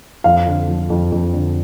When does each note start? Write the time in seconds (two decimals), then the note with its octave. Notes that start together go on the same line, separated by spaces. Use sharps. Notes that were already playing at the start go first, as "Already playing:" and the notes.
0.24 F2 F5
0.47 D3
0.68 F3
0.90 F2
1.12 F2
1.34 D3